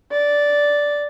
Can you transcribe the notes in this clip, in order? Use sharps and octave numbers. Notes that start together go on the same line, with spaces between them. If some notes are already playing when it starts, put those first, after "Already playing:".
D5